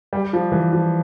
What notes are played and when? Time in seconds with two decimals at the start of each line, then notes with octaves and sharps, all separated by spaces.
0.13 G3
0.33 F3
0.52 E3
0.73 F3